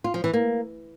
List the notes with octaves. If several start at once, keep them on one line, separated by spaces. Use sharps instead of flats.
F4
F3
E3
A#3